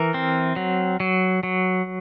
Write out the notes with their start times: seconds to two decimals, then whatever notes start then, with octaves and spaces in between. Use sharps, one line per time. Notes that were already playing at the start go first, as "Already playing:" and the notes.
Already playing: E3 A#4
0.14 C4
0.56 F#3
1.00 F#3
1.43 F#3